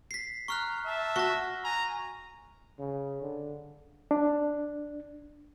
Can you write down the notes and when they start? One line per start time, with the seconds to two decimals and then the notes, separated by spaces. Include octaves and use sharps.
0.11 B6 C7
0.48 A#5 C#6 F6 F#6
0.86 E5 A5
1.16 F#4 C#6 A#6
1.64 G#5 A#5
2.79 C#3
3.22 D3
4.11 D4